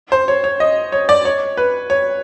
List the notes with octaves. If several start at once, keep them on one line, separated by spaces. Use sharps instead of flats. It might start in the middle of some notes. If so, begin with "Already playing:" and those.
C5
C#5
C#5
D#5
C#5
D5
C#5
B4
C#5